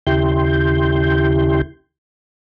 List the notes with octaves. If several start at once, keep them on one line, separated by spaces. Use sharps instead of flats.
D#2 C#3 E4 G4 C6 G6